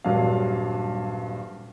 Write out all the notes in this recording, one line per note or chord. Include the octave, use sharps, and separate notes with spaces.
D#1 G2 F#3 D4 F5